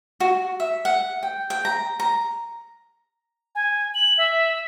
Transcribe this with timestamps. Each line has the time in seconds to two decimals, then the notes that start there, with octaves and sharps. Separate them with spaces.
0.20 F#4
0.60 E5
0.85 F#5
1.23 G5
1.50 G5
1.65 A#5
2.00 A#5
3.55 G#5
3.94 F#7
4.18 E5